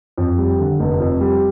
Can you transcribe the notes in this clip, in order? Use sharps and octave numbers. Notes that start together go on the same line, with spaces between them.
F2
G3
D3
F1
F2
G3